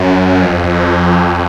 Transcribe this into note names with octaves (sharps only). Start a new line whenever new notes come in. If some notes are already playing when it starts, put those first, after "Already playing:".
Already playing: F#2
F2
F2